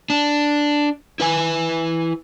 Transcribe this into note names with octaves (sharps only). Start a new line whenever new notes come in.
D4
E4 B4 G#5